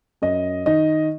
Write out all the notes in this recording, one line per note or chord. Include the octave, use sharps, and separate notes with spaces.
F#2 D#5
D#3 D#5